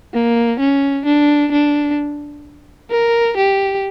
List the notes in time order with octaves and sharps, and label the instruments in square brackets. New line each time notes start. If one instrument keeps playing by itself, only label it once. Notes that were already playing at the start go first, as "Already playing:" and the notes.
[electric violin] A#3
C#4
D4
D4
A#4
G4